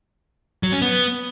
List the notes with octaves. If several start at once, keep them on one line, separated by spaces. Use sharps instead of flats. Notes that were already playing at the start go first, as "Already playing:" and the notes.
F#3
C#4
B3